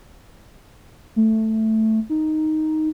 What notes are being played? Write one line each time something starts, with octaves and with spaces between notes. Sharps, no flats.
A3
D#4